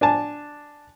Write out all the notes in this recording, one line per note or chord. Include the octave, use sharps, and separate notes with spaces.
D4 G#5 A5